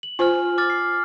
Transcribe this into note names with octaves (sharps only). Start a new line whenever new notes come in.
F#7
F4 C5 G#5 F6
D6 F6 A6
C7